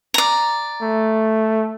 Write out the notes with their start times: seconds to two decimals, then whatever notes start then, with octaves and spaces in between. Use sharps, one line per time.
0.14 D5 A#5
0.81 A3